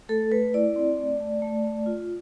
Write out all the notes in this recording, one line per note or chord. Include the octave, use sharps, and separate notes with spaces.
A3 A4
A3 B4
E4 D5
C4
A3
A3
A3
A3
F4